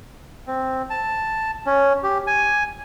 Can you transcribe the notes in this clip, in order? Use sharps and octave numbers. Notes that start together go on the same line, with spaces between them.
C4
A5
C#4
G4
G#5